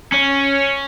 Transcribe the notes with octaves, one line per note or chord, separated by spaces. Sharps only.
C#4